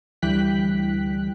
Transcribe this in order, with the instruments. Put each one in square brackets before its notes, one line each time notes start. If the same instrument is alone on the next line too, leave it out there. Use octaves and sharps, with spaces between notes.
[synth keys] D2 E3 G3 G5 F#6 B6